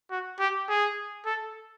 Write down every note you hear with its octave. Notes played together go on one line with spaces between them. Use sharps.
F#4
G4
G#4
A4